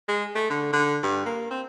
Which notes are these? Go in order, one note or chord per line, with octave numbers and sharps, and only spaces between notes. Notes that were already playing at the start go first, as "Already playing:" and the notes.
G#3
A3
D3
D3
G2
A#3
C4